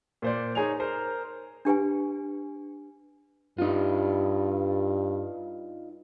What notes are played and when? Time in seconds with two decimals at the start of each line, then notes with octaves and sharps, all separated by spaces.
0.22 A#2 C5 D5
0.55 D#4 G#4 C#5 G#5 F7
0.80 A#4 C5
1.65 D4 G4 B4 G#5
3.58 G2 D#4 F4